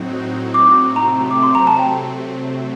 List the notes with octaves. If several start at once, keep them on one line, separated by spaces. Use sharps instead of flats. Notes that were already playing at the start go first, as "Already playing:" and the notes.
Already playing: A2 F#3 C4 D#4 F#4
D6
C3 F#3 A3 C4 A#5
D6
C6
A#5
A5
G5